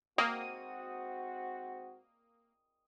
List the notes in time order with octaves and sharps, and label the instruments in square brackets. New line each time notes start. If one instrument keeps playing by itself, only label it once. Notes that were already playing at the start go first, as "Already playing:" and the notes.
[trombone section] G#2 C4 F#4 [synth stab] A#3 [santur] D#6